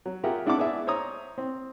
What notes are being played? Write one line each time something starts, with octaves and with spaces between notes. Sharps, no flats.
F#3
F4 G4 G#4 A#4 E5 F#5
G#3 D4 E4 F#5 A5 D6
B3 G#4 D5 E5
C5 C#5 A#5 D#6
C4